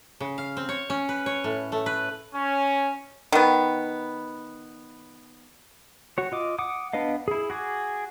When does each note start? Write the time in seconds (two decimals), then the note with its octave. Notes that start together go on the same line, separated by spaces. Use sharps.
0.20 C#3
0.38 F5
0.57 C4
0.69 C#5
0.90 C#4
1.09 B4
1.26 C#5
1.44 A2
1.72 A3
1.86 B4
2.34 C#4
3.32 D#3 B3
6.18 F#4 C#5
6.32 F4 D#5 D6
6.59 F#5 D6 D#6
6.93 B3 D4 B4 D#5 F5
7.28 E4 G#4
7.50 F#4 G#4 D6